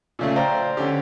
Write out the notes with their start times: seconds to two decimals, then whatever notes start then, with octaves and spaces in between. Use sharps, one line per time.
0.19 A#2 C#3 A3
0.36 C5 D5 F5 G5 A#5
0.77 D3 C#4 G4